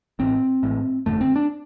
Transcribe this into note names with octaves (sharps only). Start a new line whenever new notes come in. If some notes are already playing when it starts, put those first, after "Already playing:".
A1 A2 C4
A1 A2
G1 F2 D3 A3
C4
D4